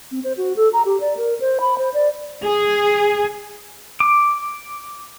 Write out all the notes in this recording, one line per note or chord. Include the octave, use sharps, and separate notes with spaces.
C4
C5
F#4
A4
A#5
G4
D5
A#4
C5
B5
C5
D5
G#4
D6